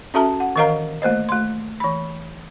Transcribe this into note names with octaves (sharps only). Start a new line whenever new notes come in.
C#4 F#4 A4 E5 A5 A#5
F#5
D#3 E3 A#4 D#5 F5 A#5
A3 A#3 C5 D#5
A3 C6
E3 B5